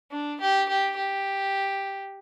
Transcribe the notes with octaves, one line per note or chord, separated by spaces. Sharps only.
D4
G4
G4
G4